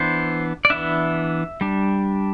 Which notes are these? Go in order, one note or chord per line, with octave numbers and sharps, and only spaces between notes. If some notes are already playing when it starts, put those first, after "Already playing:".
Already playing: E3 B3 D4 C5
D5
E3 B3 D4 E5
G3 D4